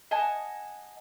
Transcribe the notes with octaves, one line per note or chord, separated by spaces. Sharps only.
D#5 F#5 G#5 A5